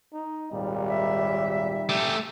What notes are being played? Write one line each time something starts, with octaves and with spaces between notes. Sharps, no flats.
D#4
G#1 D#2 A#2 G3
E5
A3 G4